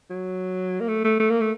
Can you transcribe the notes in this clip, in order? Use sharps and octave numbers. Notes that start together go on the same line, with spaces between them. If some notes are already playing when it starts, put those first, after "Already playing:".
F#3
A#3
A3
A3
A3
A#3
A3